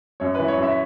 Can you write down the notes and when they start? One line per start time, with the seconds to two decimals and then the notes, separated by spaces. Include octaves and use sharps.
0.20 F#2 C#5
0.35 E3 B4
0.48 C#5
0.57 F#2
0.63 E5